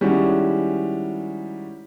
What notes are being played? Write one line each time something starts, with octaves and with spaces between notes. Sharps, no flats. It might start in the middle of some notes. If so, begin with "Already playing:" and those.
D#3 G3 G#3 C#4 E4 F#4